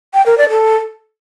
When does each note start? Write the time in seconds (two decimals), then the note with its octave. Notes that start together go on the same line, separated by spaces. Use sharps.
0.14 G5
0.26 A#4
0.38 D5
0.50 A4